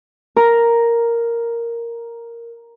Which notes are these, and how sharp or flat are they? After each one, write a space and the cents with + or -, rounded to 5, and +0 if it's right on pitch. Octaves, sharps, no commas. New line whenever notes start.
A#4 +0 A#5 +5